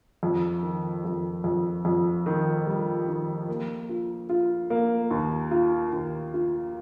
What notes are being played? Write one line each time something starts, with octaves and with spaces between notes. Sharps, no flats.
F2
D#3
F2
F2
F2
D#3
G3
D#3
A#3
F4
F4
A#3
D#2
F4
D#2
F4